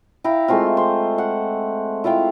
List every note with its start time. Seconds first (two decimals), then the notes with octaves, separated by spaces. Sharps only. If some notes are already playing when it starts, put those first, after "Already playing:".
0.24 E4 F5 G5 A#5
0.48 G#3 A3 C4 F4
0.77 C5
1.18 F#5
2.04 E4 F4 F5 G5